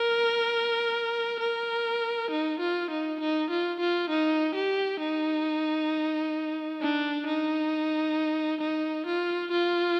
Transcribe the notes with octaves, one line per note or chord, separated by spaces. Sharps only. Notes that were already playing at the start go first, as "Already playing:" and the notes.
Already playing: A#4
A#4
D#4
F4
D#4
D#4
F4
F4
D#4
G4
D#4
D4
D#4
D#4
F4
F4